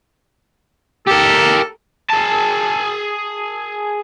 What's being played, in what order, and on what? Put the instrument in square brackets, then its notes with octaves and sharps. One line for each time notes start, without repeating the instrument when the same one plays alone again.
[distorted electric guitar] G4 A#4 [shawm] A4
[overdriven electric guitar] G#4 A5